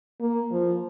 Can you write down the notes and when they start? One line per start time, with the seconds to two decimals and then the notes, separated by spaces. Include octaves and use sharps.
0.20 A#3
0.52 F3